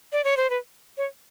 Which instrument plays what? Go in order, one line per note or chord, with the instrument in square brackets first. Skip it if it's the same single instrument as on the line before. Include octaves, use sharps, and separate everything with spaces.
[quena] D5
C#5
C5
B4
C#5